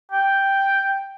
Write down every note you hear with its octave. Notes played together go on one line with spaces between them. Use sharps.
G5